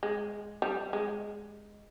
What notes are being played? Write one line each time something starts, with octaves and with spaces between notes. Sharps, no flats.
G#3
G3
G#3